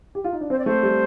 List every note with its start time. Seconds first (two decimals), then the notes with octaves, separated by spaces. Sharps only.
0.15 G4
0.24 F4
0.33 D#4
0.41 D4
0.50 C4 C5
0.58 D5
0.65 A3 C5
0.83 G3